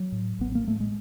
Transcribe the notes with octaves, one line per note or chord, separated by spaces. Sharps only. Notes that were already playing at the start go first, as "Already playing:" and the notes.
Already playing: F#3
A2
A1 B3
A#3
A2 A3
G#3